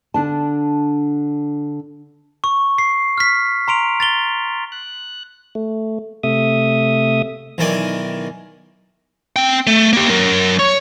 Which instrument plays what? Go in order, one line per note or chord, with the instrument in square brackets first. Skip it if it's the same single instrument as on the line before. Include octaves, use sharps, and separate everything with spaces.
[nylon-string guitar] D3 D4 A5
[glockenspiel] C#6
C7
F6 B6
A#5 C6 D7 F7
A6 F7 G7
[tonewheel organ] F#6
A3
C3 A3 E5 D#6
[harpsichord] B1 D#3 E3 A#4 D5 G#5
[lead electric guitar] C4 G5
A3
A#3 G4
F#3 A#4
C#5